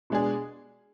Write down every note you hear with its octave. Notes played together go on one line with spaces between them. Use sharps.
B2 G#3 D4 G#4